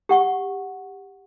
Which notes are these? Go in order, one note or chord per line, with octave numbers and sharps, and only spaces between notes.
G4 F#5 C#6